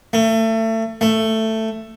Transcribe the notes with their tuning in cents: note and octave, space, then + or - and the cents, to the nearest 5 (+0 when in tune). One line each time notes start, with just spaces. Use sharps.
A3 +30
A3 +10